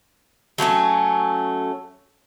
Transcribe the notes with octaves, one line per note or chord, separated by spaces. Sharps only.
F#3 A3 A#3 C#4